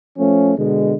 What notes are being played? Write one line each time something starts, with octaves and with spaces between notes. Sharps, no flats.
F3 A3 C#4
B2 D3 G#3